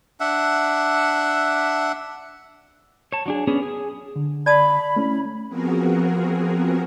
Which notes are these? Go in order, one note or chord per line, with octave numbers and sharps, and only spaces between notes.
D4 E5 F#5
C#5 A5
F#3 D4 G#4
B3 C#4 D4 G#4
G#4
D3
D5 A5 B5 D#6
A3 C#4 E4
F3 B3 C4 F#4 G#4 A#4